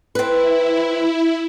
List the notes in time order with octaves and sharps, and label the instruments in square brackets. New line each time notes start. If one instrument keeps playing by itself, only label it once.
[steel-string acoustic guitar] C4 B4 [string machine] E4